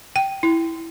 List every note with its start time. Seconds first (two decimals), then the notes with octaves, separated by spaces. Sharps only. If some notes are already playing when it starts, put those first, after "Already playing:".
0.16 G5
0.43 E4